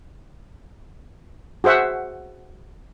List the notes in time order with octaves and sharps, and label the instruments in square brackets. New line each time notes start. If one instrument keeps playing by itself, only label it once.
[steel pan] F#4 G#4 C5 E5 F#5